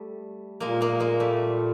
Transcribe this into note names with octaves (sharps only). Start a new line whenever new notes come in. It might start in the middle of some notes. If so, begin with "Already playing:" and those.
Already playing: G3 A3
A#2 G#3 A#3
G#3 A#3
G#3 A#3
G3 A3